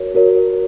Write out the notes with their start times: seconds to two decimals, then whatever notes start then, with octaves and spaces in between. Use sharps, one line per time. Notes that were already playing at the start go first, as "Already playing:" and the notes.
Already playing: F#4 A#4 C#5
0.15 F#4 A#4 C#5